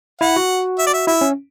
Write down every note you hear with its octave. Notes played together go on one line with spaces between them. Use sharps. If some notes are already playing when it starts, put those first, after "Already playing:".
E4 F#5
F#4
E5
D5
E5
E4 E5
C#4